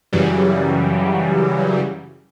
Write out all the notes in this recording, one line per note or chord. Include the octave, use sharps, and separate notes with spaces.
F#2 C#3 E3 F#3 G3